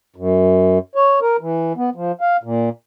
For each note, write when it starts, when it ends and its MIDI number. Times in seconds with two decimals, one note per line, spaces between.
0.16 0.78 42
0.95 1.20 73
1.21 1.37 70
1.41 1.73 52
1.77 1.90 59
1.95 2.12 53
2.21 2.37 77
2.43 2.69 46